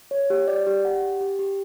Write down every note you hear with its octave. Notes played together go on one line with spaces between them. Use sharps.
C#5
G4
D5
G4
F#5
G4
G4
G4